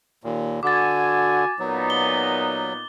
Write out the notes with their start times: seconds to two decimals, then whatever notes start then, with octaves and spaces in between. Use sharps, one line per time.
0.24 D#2 A#2
0.63 D3 F#4 G#5 D6 A6
1.59 A#2 F#3 B3 D#4
1.90 G7